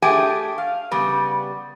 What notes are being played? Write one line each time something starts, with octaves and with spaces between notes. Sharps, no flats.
A3 D4 G4 G#4 G5 G#5
F5
C#3 G3 B3